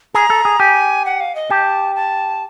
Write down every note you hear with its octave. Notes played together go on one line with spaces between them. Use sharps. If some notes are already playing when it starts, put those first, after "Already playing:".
G#4 A#5
A4
G#4
G4 G#5
F#5
F5
D#5
G4 A5
A5